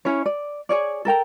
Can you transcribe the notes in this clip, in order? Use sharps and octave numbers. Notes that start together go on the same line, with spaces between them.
C#4 E4 C#5
D5
G#4 C#5 D5
A4 A#4 G5 A#5